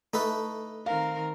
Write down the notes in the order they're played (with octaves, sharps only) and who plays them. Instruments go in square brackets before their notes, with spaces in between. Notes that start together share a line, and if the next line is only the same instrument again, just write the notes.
[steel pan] A3 [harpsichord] D#4 A4 B4
[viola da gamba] D#3 C4 A#4 [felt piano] F5